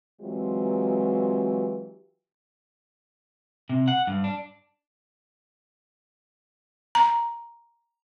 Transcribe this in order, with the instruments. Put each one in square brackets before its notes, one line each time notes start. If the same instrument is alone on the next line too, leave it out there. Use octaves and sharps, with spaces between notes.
[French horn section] E3 F#3 G#3 C4 F4 G4
[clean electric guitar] C3
F#5
G2
D4
[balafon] A#5